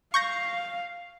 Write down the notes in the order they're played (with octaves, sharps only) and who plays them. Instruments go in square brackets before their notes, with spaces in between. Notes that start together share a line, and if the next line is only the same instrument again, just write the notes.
[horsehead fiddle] F5 [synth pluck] C#6 G6 A#6